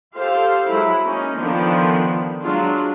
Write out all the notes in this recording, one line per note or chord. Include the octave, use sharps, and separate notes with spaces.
F4 G4 A4 C5 F5
F#3 G#3 E4
A#3 C#4 D#4
D3 D#3 F3 B3 D4
F#3 G#3 D4 F4